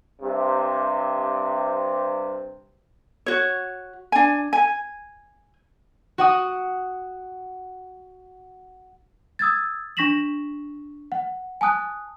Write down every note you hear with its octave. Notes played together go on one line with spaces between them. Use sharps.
G2 C3
F#4 C#5
D4 G#5
G#5
F#4 F#5 D#6
D#6 E6 G#6 A6
D4 C#6 A#6 B6 E7 F#7
F#5
G#5 A5 D#6 F#6